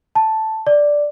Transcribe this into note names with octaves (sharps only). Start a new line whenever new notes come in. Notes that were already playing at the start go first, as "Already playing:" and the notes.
A5
D5